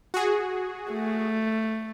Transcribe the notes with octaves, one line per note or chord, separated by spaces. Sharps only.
F#4 G#4
A3